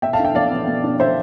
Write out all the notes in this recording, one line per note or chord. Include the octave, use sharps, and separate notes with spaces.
B2 E5 G5
F5 A5
D4
E5 G5
B2 D5 F5
B3
B2
D4
B2 C5 E5